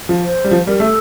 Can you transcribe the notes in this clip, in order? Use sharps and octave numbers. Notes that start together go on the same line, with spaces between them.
F3
C5
G3
F3
G3 A#4
A3 A4